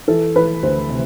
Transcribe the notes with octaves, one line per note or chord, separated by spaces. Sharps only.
E3 A4
E3 B4
D2 C5
C3